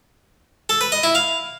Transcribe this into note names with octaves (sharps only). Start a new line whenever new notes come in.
A4
B4
D#5
E4
F5